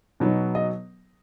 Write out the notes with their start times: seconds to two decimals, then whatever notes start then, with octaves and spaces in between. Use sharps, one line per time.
0.20 B2 F#3 B3 D#4
0.55 D#5